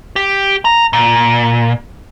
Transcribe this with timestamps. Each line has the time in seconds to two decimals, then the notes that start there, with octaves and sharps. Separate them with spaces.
0.16 G4
0.65 A#5
0.93 A#2